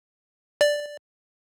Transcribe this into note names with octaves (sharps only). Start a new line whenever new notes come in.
D5